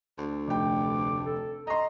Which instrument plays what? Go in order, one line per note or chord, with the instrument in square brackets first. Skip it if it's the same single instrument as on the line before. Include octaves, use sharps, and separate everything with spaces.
[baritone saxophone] D2
[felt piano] F1 G5 [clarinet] D6
[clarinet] A4
[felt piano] D#5 C6 [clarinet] A#5